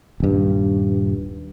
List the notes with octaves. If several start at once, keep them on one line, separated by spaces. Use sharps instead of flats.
D#1 G2